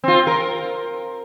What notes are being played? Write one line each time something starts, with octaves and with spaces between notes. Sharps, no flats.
C4 F4
A#4